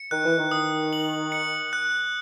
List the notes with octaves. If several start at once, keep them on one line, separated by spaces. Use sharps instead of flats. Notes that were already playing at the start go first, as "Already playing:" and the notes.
Already playing: C#7
D#3 F#6
E3
D#3
D#6
F#7
C#7
F#6